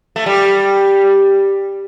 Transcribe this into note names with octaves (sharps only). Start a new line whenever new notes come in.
A3
G3